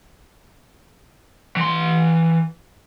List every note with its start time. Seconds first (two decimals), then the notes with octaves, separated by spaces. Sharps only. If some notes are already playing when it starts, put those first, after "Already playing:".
1.57 E3 C6